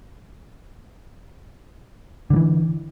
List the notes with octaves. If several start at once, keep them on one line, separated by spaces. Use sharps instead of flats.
D3 E3 G3